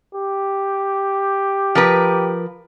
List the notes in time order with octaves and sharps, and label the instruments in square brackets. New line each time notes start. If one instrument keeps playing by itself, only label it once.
[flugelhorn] G4
[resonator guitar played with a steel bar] F3 A#4 B4